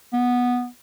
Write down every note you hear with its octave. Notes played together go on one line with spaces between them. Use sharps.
B3